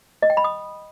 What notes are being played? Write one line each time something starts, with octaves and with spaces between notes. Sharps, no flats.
D#5
G5
B5
D#6